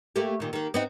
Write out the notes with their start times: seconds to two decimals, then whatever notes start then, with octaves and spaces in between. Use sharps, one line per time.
0.16 A3 A#3 G4
0.40 A#2 D#3
0.53 D#3 A#3
0.74 B3 C4 D#4